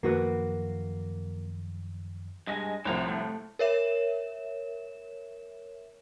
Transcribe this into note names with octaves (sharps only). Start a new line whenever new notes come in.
F#2 D#3 F3 A#3 F#4 B4
G2 G#3 D#5 G#5 A#6
C2 A2 F3 C4 A#5
A3
A#4 C#5 E5 E7